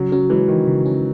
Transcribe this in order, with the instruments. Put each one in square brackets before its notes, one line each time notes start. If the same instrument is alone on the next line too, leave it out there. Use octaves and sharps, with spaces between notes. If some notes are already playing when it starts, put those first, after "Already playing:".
Already playing: [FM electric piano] C#3 [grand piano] F#3
[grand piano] F#3 [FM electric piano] C#4
[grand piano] E3 [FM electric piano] G#3
[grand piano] D#3 [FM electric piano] E3
[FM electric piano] C#3
C#4